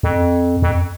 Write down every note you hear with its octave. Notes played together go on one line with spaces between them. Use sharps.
F2
F2